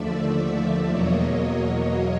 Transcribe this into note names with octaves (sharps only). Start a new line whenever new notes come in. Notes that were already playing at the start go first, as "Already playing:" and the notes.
Already playing: D#2 D3 F3 A3 D5 E5
E2 B2 F#3 A#3 C#5 D#5